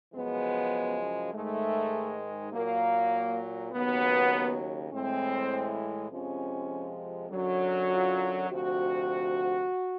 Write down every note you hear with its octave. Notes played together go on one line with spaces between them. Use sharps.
F#2 C#3 F3 G#3 B3
G#2 D#3 G#3 A3
A#2 F#3 A#3
D#2 C#3 F#3 B3
A2 E3 G#3 C4
F2 C3 F3 G#3 C#4
F#2 D3 F#3
F4
D2 C3 F3 F#4